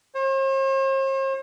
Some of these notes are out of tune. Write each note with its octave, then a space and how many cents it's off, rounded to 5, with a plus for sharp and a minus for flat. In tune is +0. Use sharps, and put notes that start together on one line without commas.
C5 +45